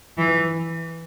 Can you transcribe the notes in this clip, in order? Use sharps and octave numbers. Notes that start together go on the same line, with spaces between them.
E3